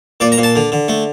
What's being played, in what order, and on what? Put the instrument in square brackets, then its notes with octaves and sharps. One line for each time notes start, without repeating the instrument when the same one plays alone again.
[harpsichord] A#2 D5
A#5
A#2
A5
D3
D3
A3